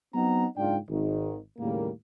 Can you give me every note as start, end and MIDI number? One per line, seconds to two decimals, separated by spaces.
0.14 0.45 54
0.14 0.45 59
0.14 0.45 60
0.14 0.45 63
0.14 0.45 78
0.14 0.45 82
0.56 0.77 30
0.56 0.77 44
0.56 0.77 62
0.56 0.77 65
0.56 0.77 74
0.56 0.77 79
0.89 1.35 32
0.89 1.35 44
0.89 1.35 51
1.59 1.89 39
1.59 1.89 45
1.59 1.89 49
1.59 1.89 55
1.59 1.89 58